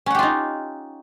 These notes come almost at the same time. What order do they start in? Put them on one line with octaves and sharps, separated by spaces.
C#4 F#5 G4 F4 D#4